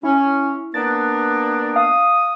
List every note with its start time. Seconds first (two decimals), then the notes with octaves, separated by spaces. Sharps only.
0.03 C#4 E4
0.74 A#3 B3 D4 A6
1.76 F5 D#6